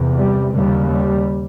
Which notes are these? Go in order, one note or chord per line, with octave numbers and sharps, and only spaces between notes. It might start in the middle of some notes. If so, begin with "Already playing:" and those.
Already playing: E2 C3
G3
D#2 C#3 G3
G3